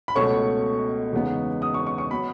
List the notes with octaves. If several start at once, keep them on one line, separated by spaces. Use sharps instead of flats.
B5
C#2 B2 F#3 A3 C#4 C#6
E2 C#3 G#3 B3 D#4
D#6
C#6
C#6
C#6
F#3 B3 B5